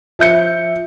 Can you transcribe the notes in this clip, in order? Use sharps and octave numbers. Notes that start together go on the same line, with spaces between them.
F3 E5 G6 C#7